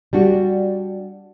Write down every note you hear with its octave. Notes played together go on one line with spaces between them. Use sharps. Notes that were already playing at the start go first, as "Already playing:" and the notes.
G3 D4 F#4